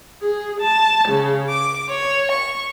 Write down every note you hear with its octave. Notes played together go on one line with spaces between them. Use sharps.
G#4
A5
C#3
D6
C#5
C#6